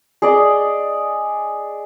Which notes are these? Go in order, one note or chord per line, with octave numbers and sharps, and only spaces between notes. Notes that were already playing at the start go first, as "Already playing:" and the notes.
G#4 D5 D#5